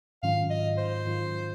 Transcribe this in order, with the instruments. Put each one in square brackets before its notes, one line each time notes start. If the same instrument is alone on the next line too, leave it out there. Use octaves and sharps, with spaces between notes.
[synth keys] G#2 D#3 F#3 C#4 F4 [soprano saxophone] F5
[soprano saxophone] D#5
C5
[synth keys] G#2 D#3 F#3 C#4 F4